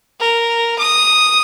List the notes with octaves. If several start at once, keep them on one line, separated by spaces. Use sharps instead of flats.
A#4
D#6